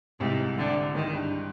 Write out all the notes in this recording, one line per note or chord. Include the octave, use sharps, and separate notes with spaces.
C2 G#2 C3
D3
G#2 D#3
G2